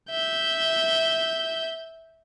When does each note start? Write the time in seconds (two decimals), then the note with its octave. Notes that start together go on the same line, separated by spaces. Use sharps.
0.11 E5 G6